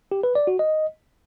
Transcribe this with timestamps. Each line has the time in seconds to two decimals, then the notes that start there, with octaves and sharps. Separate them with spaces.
0.12 G4
0.23 B4
0.35 D5
0.47 F#4
0.59 D#5